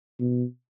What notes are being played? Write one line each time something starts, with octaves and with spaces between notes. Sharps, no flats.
B2